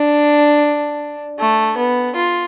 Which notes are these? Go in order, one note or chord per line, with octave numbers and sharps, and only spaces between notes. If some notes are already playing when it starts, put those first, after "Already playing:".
Already playing: D4
A3
B3
F4